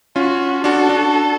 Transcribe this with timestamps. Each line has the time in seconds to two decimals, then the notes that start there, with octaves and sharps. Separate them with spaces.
0.16 C#4 F4 F#4
0.64 D4 F#4 A4
0.89 D4 F#4